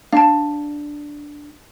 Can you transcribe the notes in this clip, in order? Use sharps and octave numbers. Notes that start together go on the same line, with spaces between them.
D4 F5 A5